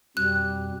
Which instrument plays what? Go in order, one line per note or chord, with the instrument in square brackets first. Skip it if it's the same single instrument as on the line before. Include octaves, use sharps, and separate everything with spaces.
[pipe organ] F2 B2 [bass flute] G3 [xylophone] F#6